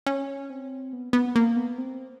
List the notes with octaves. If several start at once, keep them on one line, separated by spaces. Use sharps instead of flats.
C#4
C4
B3
B3
A#3
B3
C4